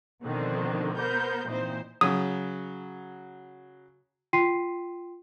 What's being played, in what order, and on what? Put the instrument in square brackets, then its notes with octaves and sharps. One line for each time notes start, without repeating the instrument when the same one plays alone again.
[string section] B2 D3 D#3 F3 C4
B3 A#4 C5 G6
A#2 E3 C4 D#4 C5
[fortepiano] C#3 F#3 [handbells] D#6
[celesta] F4 G5 C6 B6 C7 D#7